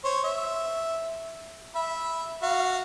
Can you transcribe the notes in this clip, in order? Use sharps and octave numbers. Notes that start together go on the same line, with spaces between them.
C5 C#5
E5
E5 B5
F#4 F5